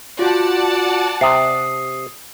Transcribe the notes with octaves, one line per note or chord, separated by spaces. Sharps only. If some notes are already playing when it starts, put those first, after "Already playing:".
F4 F#4 D5 F#5 A5
C3 D#6 C7